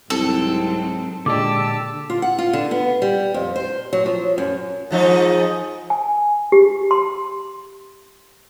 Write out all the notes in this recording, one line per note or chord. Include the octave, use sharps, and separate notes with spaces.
C2 G#2 F#3 C4 A4
A#2 D3 G#3 D4 G4 A5 D6 E6
F4
F#5
F4
D3
B3
G3
F2
C5
F#3
F3
F#2
G#2 F3 D#4
G#5
G4
C6